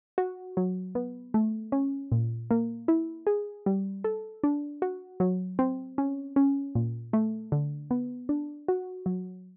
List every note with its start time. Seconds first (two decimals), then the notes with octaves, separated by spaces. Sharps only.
0.18 F#4
0.57 F#3
0.95 B3
1.34 A3
1.72 C#4
2.12 A#2
2.51 A#3
2.88 E4
3.27 G#4
3.66 G3
4.04 A4
4.44 D4
4.82 F#4
5.20 F#3
5.59 C4
5.98 C#4
6.36 C#4
6.75 A#2
7.13 A3
7.52 D3
7.91 B3
8.29 D4
8.68 F#4
9.06 F#3